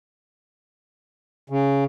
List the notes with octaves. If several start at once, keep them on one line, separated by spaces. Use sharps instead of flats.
C#3